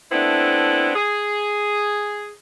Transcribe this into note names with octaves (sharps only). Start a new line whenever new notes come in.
A3 B3 C4 D4 E4
G#4